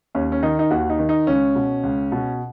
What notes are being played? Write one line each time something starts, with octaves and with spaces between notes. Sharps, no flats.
D#2 C#4
C#4
D#3 D#4
D#4
D#2 F#4
D#4
D#3
D#4
C#2 C#4
B2
C#2
B2